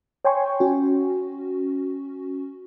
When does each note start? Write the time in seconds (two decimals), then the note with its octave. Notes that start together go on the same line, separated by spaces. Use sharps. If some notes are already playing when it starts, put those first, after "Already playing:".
0.25 C#5 G5 G#5 C6 C#6
0.60 C#4 F#4